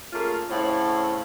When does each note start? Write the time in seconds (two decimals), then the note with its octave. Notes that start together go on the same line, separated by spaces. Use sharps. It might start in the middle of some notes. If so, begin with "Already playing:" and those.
0.13 A3 A#3 C#4 F4 G#4
0.50 A2 C#3 C4 C#5 F5